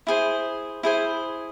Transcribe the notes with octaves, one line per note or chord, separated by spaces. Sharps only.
E4 G#4 C5
E4 G#4 C5